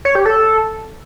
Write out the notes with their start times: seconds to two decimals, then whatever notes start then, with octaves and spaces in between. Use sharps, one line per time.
0.05 C#5
0.15 G4
0.26 A4